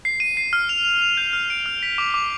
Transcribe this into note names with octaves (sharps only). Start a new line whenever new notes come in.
C7
D#7
C7
F6
F7
F7
F7
G6
F6
D7
F6
B6
D6
D6